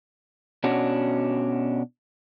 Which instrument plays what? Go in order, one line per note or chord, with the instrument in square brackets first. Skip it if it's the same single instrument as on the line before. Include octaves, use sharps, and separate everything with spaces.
[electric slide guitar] B2 C#4 D4 F#4